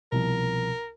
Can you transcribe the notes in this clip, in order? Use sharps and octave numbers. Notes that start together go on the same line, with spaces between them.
C2 B2 F3 A#4